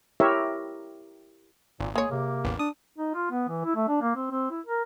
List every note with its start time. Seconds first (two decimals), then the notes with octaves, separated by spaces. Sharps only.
0.20 E4 G4 A#4 C#5 E5
1.80 G#1 A#2
1.95 G#3 A#3 G#4 C#5
2.11 C3 A#3
2.44 A1 E2
2.59 D4 D#6
2.98 D#4
3.15 F4
3.31 B3
3.49 E3
3.65 E4
3.76 A3
3.88 D4
4.01 A#3
4.15 C4
4.31 C4
4.50 E4
4.66 A#4